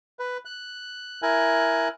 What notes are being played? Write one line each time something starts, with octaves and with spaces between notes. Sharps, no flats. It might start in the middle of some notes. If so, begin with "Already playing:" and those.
B4
F#6
E4 A#4 G#5 F#6